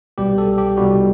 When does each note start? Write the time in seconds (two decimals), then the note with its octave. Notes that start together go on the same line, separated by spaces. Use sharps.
0.18 C2 B2 G3 G4
0.38 A4
0.58 G4
0.77 C2 B2 G3 F#4